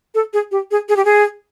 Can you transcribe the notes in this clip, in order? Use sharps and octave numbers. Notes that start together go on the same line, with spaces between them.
A4
G#4
G4
G#4
G#4
G4
G#4